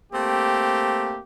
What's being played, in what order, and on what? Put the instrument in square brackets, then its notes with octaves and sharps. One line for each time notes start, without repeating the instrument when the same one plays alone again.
[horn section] A3 A#3 C4 G4